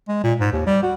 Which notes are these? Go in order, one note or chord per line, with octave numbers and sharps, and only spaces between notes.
G#3
A#2
G#2
D#2
G3
F#4